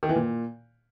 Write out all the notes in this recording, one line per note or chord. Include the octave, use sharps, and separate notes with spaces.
D#3
E3
A#2